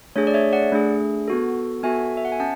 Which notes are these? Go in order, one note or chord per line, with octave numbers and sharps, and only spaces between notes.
A3 D4 G#4 C#5
D5
C#5 E5
D5 F#5
A3 D4 G#4
B3 F#4 A4
B3 F#4 A4 E5 G#5
E5
F#5
G#5
C#4 F#5 A5